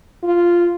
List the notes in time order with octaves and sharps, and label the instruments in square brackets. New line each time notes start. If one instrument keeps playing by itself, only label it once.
[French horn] F4